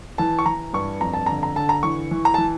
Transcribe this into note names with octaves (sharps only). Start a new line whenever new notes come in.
E3 A5
C#6
E3 A#5
G2 C#6
F2 A#5
A5
D3 A#5
A#5
D3 A5
A#5
E3 C#6
E3
A#5
E3 A5